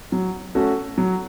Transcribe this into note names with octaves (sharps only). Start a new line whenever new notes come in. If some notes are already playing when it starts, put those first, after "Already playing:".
F#3
A3 C#4 F#4 A4
F#3